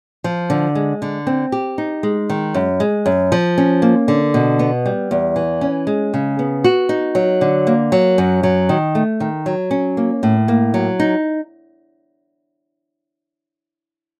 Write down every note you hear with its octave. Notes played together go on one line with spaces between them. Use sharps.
F3
D3
G#3
D3
C4
G4
D#4
G#3
D#3
F#2
G#3
F#2
F3
C#4
A#3
D3
B2
B3
G3
E2
E3
C#4
G#3
C#3
B3
F#4
D#4
F#3
D3
A#3
F#3
F#2
F#3
D#3
A3
D#3
F#3
C#4
A#3
A2
A#3
F#3
D#4